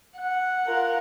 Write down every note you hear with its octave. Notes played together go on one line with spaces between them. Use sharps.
F#5
F4 A#4